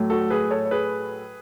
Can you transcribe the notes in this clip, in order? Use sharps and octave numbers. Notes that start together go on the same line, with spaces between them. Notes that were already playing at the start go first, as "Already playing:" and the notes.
Already playing: A2 F#3 A3
F#4 A4
G#4 B4
A4 C#5
C#5
G#4 B4